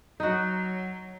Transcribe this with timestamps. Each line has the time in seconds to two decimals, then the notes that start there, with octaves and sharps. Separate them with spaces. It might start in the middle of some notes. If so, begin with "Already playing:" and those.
0.20 F#3 D#4 F#4